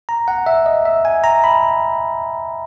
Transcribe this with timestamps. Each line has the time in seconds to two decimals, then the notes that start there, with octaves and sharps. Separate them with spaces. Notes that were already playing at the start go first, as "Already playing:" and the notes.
0.09 A#5
0.28 F#5
0.46 E5
0.66 D#5
0.85 E5
1.05 G#5
1.24 A#5
1.44 B5